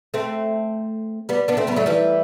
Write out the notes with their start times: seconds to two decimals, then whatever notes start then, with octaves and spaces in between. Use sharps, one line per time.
0.14 A3 C4
1.29 G3 B3
1.48 B3 D4
1.57 A3 C4
1.67 G3 B3
1.76 F#3 A3
1.86 E3 G3